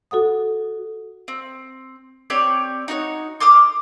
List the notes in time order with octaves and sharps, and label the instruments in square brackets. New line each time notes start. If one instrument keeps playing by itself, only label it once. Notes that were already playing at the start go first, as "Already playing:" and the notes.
[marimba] F#4 A4 F#5 D#6
[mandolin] C4
C4 G4 C#5 D5
D#4 F#4 C#5
C6 D6 D#6 F6